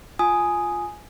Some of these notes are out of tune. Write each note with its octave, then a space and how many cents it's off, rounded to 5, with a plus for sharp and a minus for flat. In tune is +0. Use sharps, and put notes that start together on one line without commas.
F4 +10 G#5 +5 D#6 +0